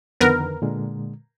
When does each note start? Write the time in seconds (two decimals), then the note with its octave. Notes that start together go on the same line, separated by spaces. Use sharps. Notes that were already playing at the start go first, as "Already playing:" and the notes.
0.21 F2 D3 D#3 B3 A#4 B4
0.62 A#2 D3 G#3